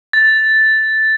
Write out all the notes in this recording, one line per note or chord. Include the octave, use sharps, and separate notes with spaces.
A6